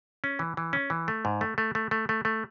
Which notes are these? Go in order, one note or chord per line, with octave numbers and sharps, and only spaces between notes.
C#4
E3
E3
C#4
E3
A3
G#2
A3
A3
A3
A3
A3
A3